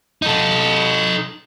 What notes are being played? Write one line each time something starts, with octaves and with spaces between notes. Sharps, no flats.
D#4 A4